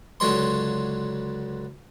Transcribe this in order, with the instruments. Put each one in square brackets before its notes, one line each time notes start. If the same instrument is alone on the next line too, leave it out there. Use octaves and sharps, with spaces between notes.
[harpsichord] C#2 D3 F#3 C#5 C6